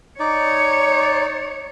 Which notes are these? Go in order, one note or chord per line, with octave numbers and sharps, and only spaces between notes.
D#4 C#5 D5